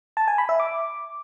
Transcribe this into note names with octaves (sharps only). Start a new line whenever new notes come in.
A5
G#5
B5
E5
D6